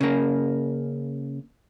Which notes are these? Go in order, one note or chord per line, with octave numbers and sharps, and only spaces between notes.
C#3 A#3